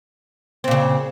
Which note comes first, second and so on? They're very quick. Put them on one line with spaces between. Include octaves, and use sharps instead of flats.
C4 A#2 C#3